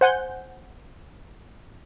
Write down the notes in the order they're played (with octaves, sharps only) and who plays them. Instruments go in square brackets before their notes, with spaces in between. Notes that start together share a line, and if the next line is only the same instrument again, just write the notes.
[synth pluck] C5 F#5 G#5 G6